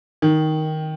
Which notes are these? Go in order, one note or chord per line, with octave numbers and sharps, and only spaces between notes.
D#3